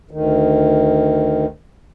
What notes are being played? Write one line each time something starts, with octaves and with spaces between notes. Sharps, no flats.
D2 D#3